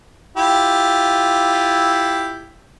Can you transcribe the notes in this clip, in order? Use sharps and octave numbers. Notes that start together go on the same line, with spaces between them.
E4 F4 G4